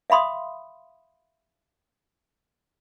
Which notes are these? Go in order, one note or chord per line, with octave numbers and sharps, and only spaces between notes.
E5 F5 B5 C6 D#6